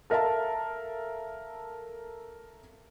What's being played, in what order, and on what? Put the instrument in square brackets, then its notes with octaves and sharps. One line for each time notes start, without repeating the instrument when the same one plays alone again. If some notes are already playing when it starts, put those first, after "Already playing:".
[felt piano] A4 A#4 E5 F5 A5